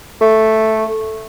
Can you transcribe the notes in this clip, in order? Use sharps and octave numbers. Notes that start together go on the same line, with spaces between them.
A3